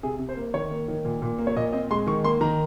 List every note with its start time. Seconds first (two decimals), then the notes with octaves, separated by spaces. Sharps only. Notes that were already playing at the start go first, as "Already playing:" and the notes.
0.03 C3 G#4
0.19 C3
0.29 C5
0.37 A#3
0.54 D#3 C#5
0.71 A#3
0.88 D#3
1.05 A#2
1.22 A#2
1.39 A#3
1.47 C#5
1.56 A#2 D#5
1.72 C4 D#5
1.91 G#3 C6
2.07 D#3 C#6
2.24 A#3 C6
2.41 D#3 A#5